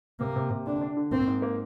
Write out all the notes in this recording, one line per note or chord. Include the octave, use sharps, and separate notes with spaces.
C3 A#3
C3
C3
D3 D4
D4
D3
A#3 C4
G#2
A#3